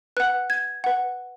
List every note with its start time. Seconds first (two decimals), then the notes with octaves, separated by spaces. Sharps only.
0.17 B4 F#5 F#6
0.50 G#6
0.84 B4 F#5